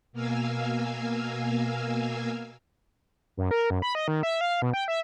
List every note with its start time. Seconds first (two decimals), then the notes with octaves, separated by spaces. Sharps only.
0.13 B2 A#3 A#4 F5 G#5 E6
3.37 F#2
3.51 A#4
3.70 F#2
3.82 B5
3.95 D#5
4.08 D#3
4.23 E5
4.41 F5
4.62 B2
4.73 G5
4.88 E5